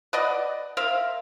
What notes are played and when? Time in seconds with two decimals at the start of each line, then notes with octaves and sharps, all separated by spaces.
0.13 B4 D5 D#5 F#5
0.77 A#4 C5 E5 F5